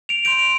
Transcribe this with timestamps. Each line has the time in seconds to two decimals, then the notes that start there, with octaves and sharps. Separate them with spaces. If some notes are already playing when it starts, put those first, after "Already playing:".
0.09 D7 F7
0.25 C6 G6 D7 F7